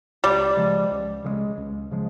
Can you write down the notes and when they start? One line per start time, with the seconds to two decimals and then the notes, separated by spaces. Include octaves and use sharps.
0.24 C#2 G3
0.57 C#3 F3 G#3
0.91 C#2
1.24 C#3 F3 G#3
1.58 C#2
1.91 C#3 F3 G#3